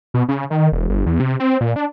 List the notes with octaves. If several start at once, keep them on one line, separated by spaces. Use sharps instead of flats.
B2
C#3
D#3
E1
G1
E2
C3
C4
A#2
D4